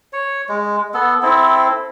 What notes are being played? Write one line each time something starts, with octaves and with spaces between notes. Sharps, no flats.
C#5
G#3
B3 A4
C4 E4 A4